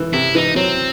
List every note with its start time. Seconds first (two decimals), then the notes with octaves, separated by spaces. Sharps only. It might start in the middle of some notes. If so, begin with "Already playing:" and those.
Already playing: E3
0.13 C3 E4
0.35 E3 D#4
0.56 F#3 C4